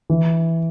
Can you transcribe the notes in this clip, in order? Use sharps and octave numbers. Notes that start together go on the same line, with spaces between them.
E3